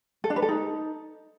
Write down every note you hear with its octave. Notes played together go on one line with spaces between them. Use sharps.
A4
D4
B4
A4
D#4